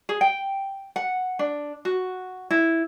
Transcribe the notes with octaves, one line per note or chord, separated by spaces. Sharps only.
G#4
G5
F#5
D4
F#4
E4